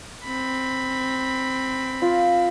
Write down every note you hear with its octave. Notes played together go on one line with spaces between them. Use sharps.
C4 B5
F4